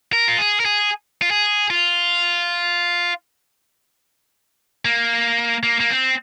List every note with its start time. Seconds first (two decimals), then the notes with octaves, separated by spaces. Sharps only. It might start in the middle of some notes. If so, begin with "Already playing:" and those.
0.13 A#4
0.28 F4
0.38 G#4
0.60 A#4
0.65 G#4
1.22 F4
1.31 G#4
1.70 F4
4.85 A#3
5.63 A#3
5.80 A#3
5.90 C4